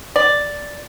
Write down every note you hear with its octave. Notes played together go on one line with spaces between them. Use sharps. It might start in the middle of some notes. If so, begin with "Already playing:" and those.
D5